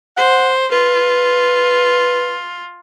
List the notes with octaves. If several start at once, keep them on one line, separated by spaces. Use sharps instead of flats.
C5 F#5
F4 B4